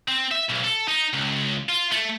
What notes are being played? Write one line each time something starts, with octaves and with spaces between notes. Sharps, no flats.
C4
E5
B1
A4
D#4
C#2
F4
A3